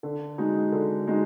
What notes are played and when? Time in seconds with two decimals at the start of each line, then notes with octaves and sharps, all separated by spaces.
0.03 D3
0.38 G#3 D#4 F#4
0.72 D3
1.07 G#3 D#4 F#4